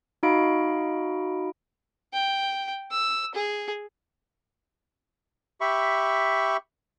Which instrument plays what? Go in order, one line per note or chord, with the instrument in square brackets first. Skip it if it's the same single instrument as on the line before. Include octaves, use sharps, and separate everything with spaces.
[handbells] D#4 F#4 D#5 F5 B5 D7
[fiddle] G5
E6
G#4
[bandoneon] G4 E5 B5 C#6